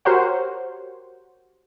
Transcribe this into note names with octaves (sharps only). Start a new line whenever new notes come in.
F#4 G4 A#4 C5 C#5 F#5